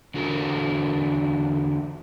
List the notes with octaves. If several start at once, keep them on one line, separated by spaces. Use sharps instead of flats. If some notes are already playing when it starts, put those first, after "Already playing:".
E2 D3 F#4 A4 A#4